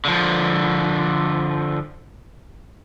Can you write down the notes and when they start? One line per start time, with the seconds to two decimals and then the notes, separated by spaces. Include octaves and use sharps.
0.05 D3 F3